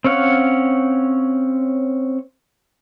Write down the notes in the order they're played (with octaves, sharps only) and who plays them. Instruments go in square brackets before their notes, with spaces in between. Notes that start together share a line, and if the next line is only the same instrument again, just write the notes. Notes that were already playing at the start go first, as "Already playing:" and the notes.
[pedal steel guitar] C4 C#4 C#5 F5 F#5